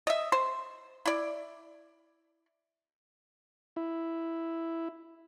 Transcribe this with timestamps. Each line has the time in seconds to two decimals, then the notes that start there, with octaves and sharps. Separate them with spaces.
0.07 D#5 E5
0.32 C5
1.06 E4 D5
3.76 E4